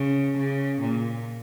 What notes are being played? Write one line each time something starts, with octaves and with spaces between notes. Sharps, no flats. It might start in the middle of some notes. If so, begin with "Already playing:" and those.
Already playing: C#3
C#3
A#2